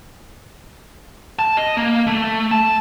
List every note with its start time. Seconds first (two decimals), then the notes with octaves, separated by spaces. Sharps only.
1.39 A5
1.57 D#5
1.77 A#3
2.07 A3
2.51 A5